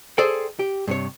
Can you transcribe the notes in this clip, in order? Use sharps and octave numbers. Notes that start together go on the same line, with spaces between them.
G#4 A4 C5 D5 G5
G4
G2 C3 C#5